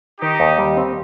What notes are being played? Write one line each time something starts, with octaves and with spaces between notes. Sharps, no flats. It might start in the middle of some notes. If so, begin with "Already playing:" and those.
D#3 D#4 G4
D#2
G3
C4